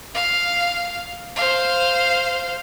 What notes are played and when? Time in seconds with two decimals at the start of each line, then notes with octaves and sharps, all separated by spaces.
0.15 F5
1.36 C5 F5